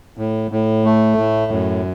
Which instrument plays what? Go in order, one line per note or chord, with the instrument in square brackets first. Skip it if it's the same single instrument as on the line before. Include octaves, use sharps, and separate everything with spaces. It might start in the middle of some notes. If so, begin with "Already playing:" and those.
[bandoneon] A2
A2
A3
A2
F#2